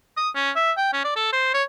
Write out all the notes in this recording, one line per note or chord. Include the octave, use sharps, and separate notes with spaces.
D#6
C#4
E5
G5
C#4
D5
A4
C5
C#5